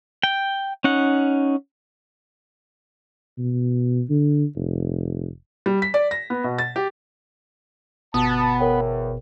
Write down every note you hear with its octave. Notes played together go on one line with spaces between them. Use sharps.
G5
C#4 D#4 F#5
B2
D3
F1
G3
B6
D5
A#6
B3
B2
A6
G4
G1 B2 B3 A5 D#6
E2 A#4 C#5 G5